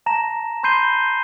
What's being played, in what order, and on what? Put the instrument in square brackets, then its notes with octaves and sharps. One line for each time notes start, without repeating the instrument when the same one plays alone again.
[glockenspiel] A5 A#5 A#6 E7
B5 C6 G6 C7 D#7 G7